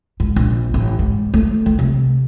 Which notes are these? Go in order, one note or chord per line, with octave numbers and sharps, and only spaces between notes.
G#2
A#1
A1
G#2
A3
D#3
C3